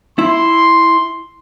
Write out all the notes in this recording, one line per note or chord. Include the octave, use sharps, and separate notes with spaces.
E4 C6